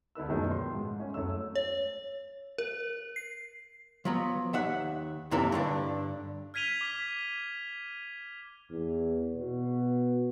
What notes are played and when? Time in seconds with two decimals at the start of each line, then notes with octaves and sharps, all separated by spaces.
0.15 D2 D3 B4 E6
0.28 F#2 B2 D#3 F3 F#3 G#3
0.51 C6
0.75 G#2
1.00 C#4
1.14 F#2 A3 C#5 E6
1.55 C#5
2.58 A#4
3.16 C7
4.05 F3 F#3 B3
4.53 D#2 E5 F#5
5.31 F#2 C3 E3 A#3 C4 A4
5.52 G2 D3 D4
6.54 F6 G#6 B6 D#7 F7 G7
6.81 D6 B6
8.70 E2
9.37 B2